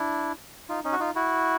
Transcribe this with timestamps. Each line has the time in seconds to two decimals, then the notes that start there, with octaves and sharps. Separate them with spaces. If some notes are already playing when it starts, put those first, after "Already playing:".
Already playing: D4 E4
0.69 D#4 F4
0.84 C#4 D#4
0.92 F#4
1.00 D#4 F4
1.15 E4 F#4